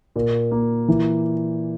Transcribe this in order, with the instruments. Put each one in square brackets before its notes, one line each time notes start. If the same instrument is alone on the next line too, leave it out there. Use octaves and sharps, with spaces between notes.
[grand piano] A#2
A#3
E3